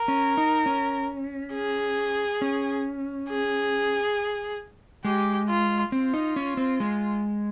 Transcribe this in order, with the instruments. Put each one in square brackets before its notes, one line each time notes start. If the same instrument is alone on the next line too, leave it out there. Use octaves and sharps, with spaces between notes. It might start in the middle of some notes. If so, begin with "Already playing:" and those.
Already playing: [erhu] A#4
[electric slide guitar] C#4
D#4
C#4
[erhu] G#4
[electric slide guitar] C#4
[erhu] G#4
[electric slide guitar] G#3 [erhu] G4
[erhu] F4
[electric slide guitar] C4 [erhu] F4
[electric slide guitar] D#4
C#4
C4
G#3